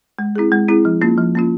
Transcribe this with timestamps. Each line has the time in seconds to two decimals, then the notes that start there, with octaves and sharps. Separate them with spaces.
0.19 G#3
0.36 C4 E4 G#4
0.52 G#3
0.68 C4 E4 G#4
0.85 F3
1.01 A#3 C#4 F4
1.18 F3
1.35 A#3 C#4 F4